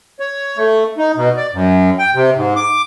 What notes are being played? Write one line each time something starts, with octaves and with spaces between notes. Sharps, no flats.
C#5
A3
D#4
B2
D5
F#2
G5
C3
G#2
D6